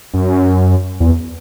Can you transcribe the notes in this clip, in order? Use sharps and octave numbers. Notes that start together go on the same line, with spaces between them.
F#2
E2